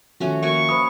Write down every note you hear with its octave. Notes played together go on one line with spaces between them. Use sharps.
D#3 F3 A3 C#4 F#4
A#3 F#4 E5 G#5 C#6
C5 C#5 B5 D#6